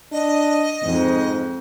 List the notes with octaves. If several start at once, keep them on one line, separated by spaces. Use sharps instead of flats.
D4 D#5
F2 G#2